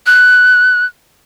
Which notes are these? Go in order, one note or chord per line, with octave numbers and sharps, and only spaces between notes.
F#6